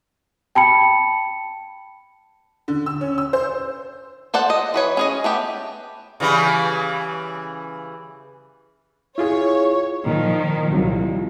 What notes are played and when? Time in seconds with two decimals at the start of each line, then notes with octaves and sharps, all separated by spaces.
0.55 G5 A5 B5 C#7
2.68 D3
2.86 E6
3.01 C#4
3.18 E6
3.33 C5
4.34 A4 C5 D5 F#5
4.50 D#5
4.74 E3 B4 C#5
4.97 C#4 G#4 D#5
5.24 A3 B3 G4
6.20 C#3 E3 G3
9.18 E4 F4 G#4 C#5
10.06 A#2 D#3 F3
10.73 C2 F#3 C4 F4